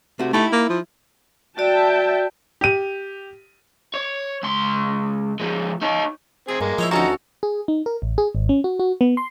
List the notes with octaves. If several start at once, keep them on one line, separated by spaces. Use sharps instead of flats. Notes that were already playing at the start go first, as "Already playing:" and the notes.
C3 A3 F#4
A3 D#4 E4 G4
A#3
F3
F#4 D5 E5 G5 A5
G4 D#7
C#5
C#2 C6
F3 G#3
D#4 C#5
C4 G#4 G#5
G2 G#3 A#3
F3 E4 C#5 D#5
D2 C#4 D#4 F#4 A4 F#5 A#5
G#4
D#4
A#4
A1
G#4
G#1
C#4
F#4
F#4
B3
C6